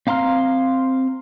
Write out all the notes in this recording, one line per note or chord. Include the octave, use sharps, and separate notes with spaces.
C4 F5 A#5 C6 F6